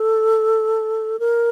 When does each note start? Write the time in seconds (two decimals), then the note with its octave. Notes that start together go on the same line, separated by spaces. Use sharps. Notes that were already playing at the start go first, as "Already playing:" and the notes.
Already playing: A4
1.19 A#4